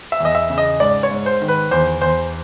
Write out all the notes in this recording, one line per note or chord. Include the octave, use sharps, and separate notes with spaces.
E5
E2 D#5
E5
C#3
D#5
G#2 D5
C#5
G#2
C5
D#3
B4
E2 C5
E2 C5